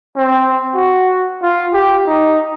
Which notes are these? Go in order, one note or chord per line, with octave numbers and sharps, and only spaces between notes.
C4
F#4
F4
G4
D#4